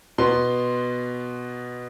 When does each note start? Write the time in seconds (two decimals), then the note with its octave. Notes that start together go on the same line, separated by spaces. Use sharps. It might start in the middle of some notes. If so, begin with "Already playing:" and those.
0.18 B2 B3 C6